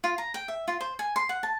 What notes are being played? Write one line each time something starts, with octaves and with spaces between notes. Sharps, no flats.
F4
A#5
G5
E5
F4
C5
G#5
C6
F#5
A5